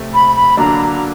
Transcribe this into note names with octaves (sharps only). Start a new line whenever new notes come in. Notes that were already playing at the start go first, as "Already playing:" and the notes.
Already playing: C3 A3 C4
B5
B5
D3 F#3 A#3 D4 A#5